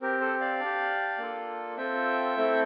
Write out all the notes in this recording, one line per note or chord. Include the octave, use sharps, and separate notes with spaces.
C4 G4 A#4
A4 C5
D5 F5
D4 G4
A#3 D4 F4 A4
C4 F4 A4 E5 G5
A3 C4 E4 A4